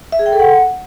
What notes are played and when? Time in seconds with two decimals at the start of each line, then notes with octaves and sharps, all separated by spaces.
0.12 E5
0.19 G#4
0.26 G5
0.33 A4
0.39 F#5